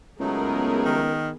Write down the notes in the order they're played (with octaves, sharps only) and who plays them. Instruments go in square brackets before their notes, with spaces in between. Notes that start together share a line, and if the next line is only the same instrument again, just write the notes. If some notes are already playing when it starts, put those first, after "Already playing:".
[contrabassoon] C#2 [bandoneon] F#3 A3 D#4 [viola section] B3 G#4 A#4
[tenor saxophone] D#3